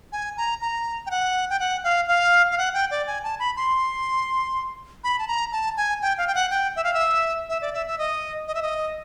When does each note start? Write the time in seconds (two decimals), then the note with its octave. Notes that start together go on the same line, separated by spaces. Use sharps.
0.12 G#5
0.37 A#5
0.61 A#5
1.06 G5
1.11 F#5
1.50 G5
1.60 F#5
1.84 F5
2.08 F5
2.51 F5
2.58 F#5
2.74 G5
2.91 D5
3.07 G#5
3.24 A5
3.40 B5
3.57 C6
5.04 B5
5.19 A5
5.28 A#5
5.52 A5
5.77 G#5
6.02 G5
6.18 F5
6.27 G5
6.35 F#5
6.51 G5
6.76 E5
6.84 F5
6.94 E5
7.49 E5
7.61 D5
7.74 E5
7.87 E5
7.98 D#5
8.47 D#5
8.55 E5
8.62 D#5